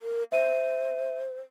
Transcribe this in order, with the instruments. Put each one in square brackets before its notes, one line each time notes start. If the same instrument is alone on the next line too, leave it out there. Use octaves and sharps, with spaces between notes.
[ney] A#4
[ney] C5 [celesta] E5 D#7